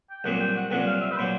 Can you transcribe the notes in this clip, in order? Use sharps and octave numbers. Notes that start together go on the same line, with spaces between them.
G5
C2 A#2 F#3 F#5
G5
F#5
C2 A#2 F#3 F#5
F5
E5
B4
A#2 F#3 C5